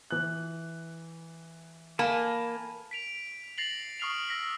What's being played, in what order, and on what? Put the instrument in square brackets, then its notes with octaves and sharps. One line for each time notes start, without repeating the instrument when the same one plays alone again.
[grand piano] E3 F#6
[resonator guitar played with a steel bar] A#3 [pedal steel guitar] G#5 A5 B5
[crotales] B6 D7 F7
A6 A#6 C7 F7 F#7
C#6 D#6 F6 C7 D7 F7
E6 A#6 B6